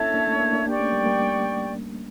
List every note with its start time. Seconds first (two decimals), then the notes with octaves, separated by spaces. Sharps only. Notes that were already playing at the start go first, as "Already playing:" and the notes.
Already playing: A#3 C#4 D4 E4 A4 C#5 E5 A5
0.14 A#3 D4
0.27 A3 C#4
0.40 A#3 D4
0.53 A#3 D4
0.66 A#3 D4 G4 D5 G5 C#6
0.79 A3 C#4
0.92 G3 A#3
1.05 G3 A#3